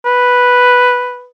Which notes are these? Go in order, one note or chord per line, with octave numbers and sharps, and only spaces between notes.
B4